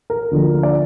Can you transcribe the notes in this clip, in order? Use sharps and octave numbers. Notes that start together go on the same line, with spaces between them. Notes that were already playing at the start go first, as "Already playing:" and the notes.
A#4
D2 D3 F3 A#3
D5